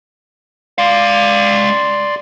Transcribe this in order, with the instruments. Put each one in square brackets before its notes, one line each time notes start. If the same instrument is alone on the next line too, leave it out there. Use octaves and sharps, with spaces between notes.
[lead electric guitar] G#3 F5 [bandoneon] D5 C6